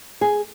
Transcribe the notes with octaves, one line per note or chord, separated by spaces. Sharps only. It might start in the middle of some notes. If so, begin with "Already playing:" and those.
G#4